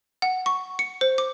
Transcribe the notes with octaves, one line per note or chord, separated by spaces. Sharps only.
F#5
C#6
C#7
C5
D6